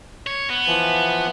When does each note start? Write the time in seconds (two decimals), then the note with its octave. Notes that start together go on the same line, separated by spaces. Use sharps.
0.27 C#5
0.50 B3
0.67 E3 F3